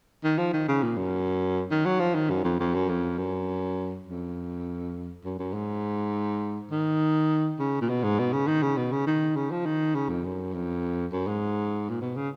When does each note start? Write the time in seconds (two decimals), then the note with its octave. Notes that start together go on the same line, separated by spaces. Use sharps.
0.24 D#3
0.38 F3
0.53 D#3
0.68 C#3
0.83 A#2
0.97 F#2
1.71 D#3
1.86 F#3
2.00 F3
2.15 D#3
2.30 F#2
2.44 F2
2.60 F2
2.74 F#2
2.89 F2
3.18 F#2
4.07 F2
5.25 F#2
5.39 F#2
5.54 G#2
6.71 D#3
7.59 C#3
7.82 A#2
7.90 B2
8.03 G#2
8.19 B2
8.33 C#3
8.47 D#3
8.63 C#3
8.77 B2
8.92 C#3
9.07 D#3
9.36 C#3
9.51 F3
9.66 D#3
9.95 C#3
10.09 F2
10.24 F#2
10.53 F2
11.12 F#2
11.27 G#2
11.90 A#2
12.01 B2
12.16 C#3